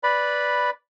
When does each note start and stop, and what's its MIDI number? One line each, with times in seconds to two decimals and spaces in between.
0.03 0.70 71
0.03 0.70 74
0.03 0.70 83